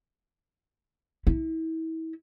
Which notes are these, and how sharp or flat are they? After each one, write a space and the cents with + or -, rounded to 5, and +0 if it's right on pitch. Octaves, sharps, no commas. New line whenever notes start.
E4 -35